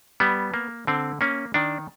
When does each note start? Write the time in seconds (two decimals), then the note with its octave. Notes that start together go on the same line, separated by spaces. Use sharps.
0.20 G3 B3
0.54 A#3
0.87 D3 C4
1.21 A#3 C#4
1.54 D#3 D4